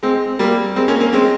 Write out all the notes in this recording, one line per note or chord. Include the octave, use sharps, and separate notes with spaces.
G#3 C4
G3 A#3
G#3 C4
A#3 C#4
A#3 C#4
G#3 C4